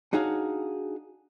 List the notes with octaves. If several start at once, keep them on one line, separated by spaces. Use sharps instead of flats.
D4 D#4 F#4 G#4 C#5 F5